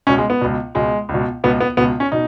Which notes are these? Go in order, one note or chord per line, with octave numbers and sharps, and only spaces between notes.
C#2 B2 C#4
G#3
B3
C#2 B2
C#2 B2 G#3
C#2
B2
C#2 B2 B3
B3
C#2 B2 B3
C#4
B2 D#4